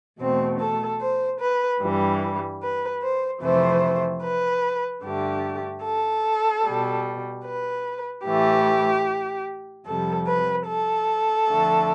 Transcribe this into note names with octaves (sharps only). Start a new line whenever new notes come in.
E2 B2 A3 C4
A4
C5
B4
G2 E3 G3
B4
C5
F2 C3 E3 A3 C5
B4
G2 D3 A3 G4
A4
B2 G3
B4
A2 E3 A3 G4
F2 C3 G3 A4
B4
A4
F2 D3 A3